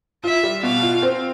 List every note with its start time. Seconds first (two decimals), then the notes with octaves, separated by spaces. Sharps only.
0.24 F4 E5
0.43 G3
0.63 B2 F5
0.82 F4
1.02 C4